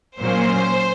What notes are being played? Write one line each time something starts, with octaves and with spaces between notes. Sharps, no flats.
A#2 F#3 A#3 C#4 C5